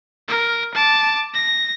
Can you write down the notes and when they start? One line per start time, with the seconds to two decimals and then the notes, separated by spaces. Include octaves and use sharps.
0.28 A#4
0.74 A5 D6
1.34 A#6